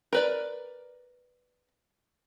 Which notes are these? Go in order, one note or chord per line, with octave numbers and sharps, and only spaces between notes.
A#4 B4 D5